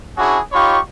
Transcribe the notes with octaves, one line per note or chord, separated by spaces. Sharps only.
C#4 D4 E4 F#4 G#4
D#4 F4 G4 C#5 B5 C#6